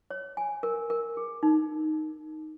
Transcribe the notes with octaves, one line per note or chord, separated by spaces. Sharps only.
C#5
G#5
A#4
A#4
G#4
D#4